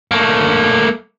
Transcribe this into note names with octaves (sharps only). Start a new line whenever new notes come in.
A3 A#3